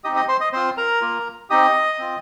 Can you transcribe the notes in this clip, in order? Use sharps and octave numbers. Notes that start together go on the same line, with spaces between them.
C4 D#4 G4 D#5 D#6
D#5 D#6
C5 C6
D#5 D#6
C4 F4 C5 C6
A#4 A#5
A#3 F4
C4 D#4 G4 D#5 D#6
C4 F4